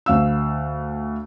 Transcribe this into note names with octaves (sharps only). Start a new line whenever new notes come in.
D2 F5 E6